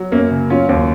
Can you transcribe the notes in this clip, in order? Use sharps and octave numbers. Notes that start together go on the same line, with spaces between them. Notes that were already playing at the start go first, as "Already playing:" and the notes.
Already playing: F#3
F#2 A#3 C#4
C#3
F#3 C#4 F4
D#2